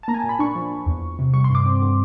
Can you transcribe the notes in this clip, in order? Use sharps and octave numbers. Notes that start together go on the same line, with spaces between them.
A5
A#3 A#5
G#5
A5
A#2
B5
D4 C#6
F3
F3
E2
E2
C3
G3 C#6
C6
G2
D6
C4
D3